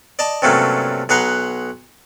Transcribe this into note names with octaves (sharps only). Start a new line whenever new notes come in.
D5 D#5 A5
G2 C3 F#3 A3 A#3 C#4
B1 G#4 B4 F#5 A#5 C6